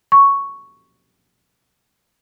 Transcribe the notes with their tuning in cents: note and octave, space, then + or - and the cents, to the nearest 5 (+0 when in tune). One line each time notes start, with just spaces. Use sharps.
C#6 +0